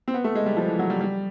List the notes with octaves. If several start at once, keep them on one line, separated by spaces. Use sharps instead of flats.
C4
B3
A3
G#3
G3
F3
E3
F#3
G3
G3